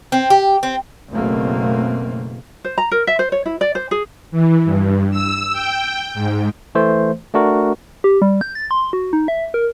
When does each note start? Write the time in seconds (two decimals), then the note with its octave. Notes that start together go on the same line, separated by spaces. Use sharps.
0.12 C4
0.30 G4
0.63 C4
1.12 F#1 B2 A3 A#3 C4
2.65 C5
2.78 A#5
2.91 A#4
3.07 E5
3.19 C5
3.32 C#5
3.46 E4
3.61 D5
3.75 C5
3.91 G#4
4.31 E3
4.65 G2
5.11 E6
5.52 G5
6.14 G#2
6.75 E3 A3 C5
7.34 A3 D4 F#4 A#4
8.04 G4
8.22 G3
8.41 G6
8.55 A6
8.71 C6
8.93 F#4
9.13 D#4
9.28 E5
9.54 A#4